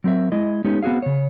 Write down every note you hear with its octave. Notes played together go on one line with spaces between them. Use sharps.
F#3 C4 A#4 E5
G#3 E4 D#5
G#3 A3 B3 C#4 D#4 G4
B3 C4 F#4 G#4 F5
C#3 C#5